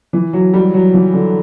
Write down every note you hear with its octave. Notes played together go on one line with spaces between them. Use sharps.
E3
F#3
G3
F#3
E3
D3